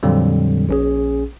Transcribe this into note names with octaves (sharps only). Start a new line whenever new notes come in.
F2 A#2 D3 F#3 G3
A#1 C#4 G#4